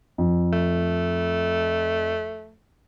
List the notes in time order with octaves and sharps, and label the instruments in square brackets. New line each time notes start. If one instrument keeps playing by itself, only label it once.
[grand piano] F2
[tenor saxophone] A3